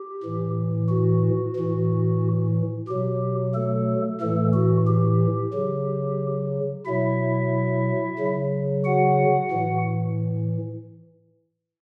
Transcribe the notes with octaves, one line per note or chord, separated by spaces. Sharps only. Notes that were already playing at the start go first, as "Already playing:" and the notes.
Already playing: G4
A2 E3
F#4
A2 E3
B2 F#3 G4
A3 A4
A2 E3 A3 A4
F#4
G4
C#3 F#3
B2 F#3 E4 E5
C#3 F#3
F#4 F#5
A2 E3